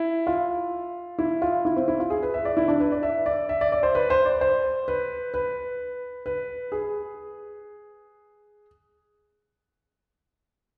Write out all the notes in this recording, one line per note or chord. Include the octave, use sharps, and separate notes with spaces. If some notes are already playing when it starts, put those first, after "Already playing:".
Already playing: E4
F4
E4
F4
E4
C4
E4
F4
G#4
B4
E5
D5
E4
D4
B4
D5
E5
D5
E5
D5
D5
C5
B4
C5
D5
C5
B4
B4
B4
G#4